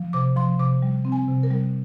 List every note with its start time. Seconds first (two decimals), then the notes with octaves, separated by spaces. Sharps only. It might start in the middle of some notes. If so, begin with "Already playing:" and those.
Already playing: F3
0.13 C3 D6
0.36 F3 C6
0.59 C3 D6
0.82 G3
1.05 C4
1.12 G#5
1.28 C3
1.43 A#4
1.51 G3